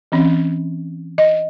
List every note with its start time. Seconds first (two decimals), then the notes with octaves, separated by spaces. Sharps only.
0.12 E3 C4 C#4
1.18 D#5